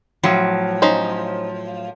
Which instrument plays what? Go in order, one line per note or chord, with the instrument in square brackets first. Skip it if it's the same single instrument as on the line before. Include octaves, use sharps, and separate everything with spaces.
[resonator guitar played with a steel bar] A2 F3 F#3
[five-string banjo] C#4 D#4 C5